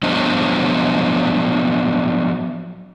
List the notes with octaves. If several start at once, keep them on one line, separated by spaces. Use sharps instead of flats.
F3 F#3 B3 D4 C5 D#5